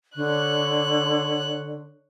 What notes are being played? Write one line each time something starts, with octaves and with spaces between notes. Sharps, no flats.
D3 C#5 F#6